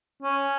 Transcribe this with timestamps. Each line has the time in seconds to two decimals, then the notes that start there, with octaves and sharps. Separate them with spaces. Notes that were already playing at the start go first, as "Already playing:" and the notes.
0.22 C#4